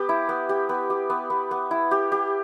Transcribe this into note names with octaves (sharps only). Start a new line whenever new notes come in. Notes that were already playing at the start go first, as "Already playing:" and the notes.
Already playing: B3 G4
E4
B3
G4
B3
G4
B3
B3
B3
E4
G4
G4